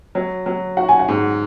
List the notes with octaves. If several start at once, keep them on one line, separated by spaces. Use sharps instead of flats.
F#3
F#3
F#4 F#5
G#5
F#5
G#2